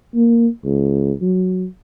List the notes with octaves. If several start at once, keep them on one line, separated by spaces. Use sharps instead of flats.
A#3
C#2
F#3